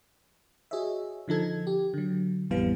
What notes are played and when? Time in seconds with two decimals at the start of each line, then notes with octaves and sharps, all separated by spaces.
0.71 F#4 G#4 C#5 D#5 E5
1.28 D3 F3 D#4 A4 G#6
1.67 G4
1.94 D3 F#3
2.51 A1 F2 E3 G3 B3 F5